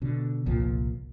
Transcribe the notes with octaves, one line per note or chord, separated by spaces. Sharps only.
B2 D3
G1 C2 A#2 F3